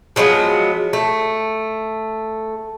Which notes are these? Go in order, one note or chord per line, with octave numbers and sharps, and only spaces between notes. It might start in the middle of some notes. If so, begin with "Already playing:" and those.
F3 F#3 G#3 B3
A3